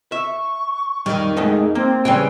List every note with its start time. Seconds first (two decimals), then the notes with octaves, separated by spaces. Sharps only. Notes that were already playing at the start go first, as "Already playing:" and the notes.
0.12 E5 C#6
1.06 F2 D#3 G3
1.37 G#3 A3 D#4 G#4
1.75 A#3 C4
2.05 C#3 E3 G3 G5